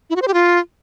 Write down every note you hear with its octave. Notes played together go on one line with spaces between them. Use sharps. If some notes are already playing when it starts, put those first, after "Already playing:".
E4
F#4
C5
G4
F4